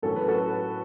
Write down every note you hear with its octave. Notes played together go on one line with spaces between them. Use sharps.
A2 F#3 C#4 A4
B4
F#4 A4